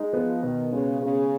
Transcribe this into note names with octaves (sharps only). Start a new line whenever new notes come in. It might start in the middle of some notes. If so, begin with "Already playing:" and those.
Already playing: G#3 D#4
F3 B3
B2 D#3
C#3 G#3
C#3 B3